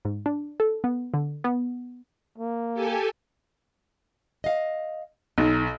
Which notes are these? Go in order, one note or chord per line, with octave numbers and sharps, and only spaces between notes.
G#2
D4
A4
B3
D3
B3
A#3
G4 A4 G#5
D#5 F5
B1 D#4